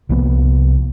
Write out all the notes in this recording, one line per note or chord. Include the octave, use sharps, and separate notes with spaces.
C2 F3 A#3 B3